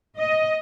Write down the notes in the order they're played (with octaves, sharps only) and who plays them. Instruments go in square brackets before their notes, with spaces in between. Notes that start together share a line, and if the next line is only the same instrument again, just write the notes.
[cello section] D#5